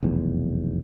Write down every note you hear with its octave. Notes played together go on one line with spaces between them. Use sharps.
F1 B1 E2